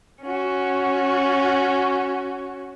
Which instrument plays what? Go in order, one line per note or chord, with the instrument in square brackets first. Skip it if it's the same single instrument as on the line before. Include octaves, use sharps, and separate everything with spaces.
[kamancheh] C#4 F#4